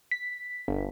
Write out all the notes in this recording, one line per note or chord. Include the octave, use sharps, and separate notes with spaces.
B6
G1